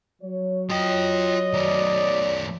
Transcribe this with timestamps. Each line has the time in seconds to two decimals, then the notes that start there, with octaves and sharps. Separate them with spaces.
0.22 F#3 C#5
0.70 F4 D#5 G5
1.54 D#3 A3 D5